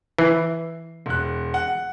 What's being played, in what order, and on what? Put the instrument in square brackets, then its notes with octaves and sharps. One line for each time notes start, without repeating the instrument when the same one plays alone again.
[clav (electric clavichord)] E3 [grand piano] C7
[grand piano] E1 F#6
F#5